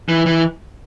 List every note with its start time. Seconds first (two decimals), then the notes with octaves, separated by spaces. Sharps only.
0.09 E3
0.26 E3